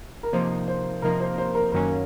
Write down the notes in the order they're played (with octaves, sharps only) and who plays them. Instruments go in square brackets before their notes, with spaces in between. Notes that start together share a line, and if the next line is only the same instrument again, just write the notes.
[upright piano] A#4
[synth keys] C3 F3 A#3 D#4 [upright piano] C5
[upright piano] C5
[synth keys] C3 F3 A#3 D#4 [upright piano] A#4
[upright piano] C5
C5
A#4
[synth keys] F#2 D#3 F#3 A#3 C#4 [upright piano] A#4